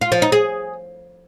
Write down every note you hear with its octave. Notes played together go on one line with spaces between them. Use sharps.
F4
F3
D#4
G#4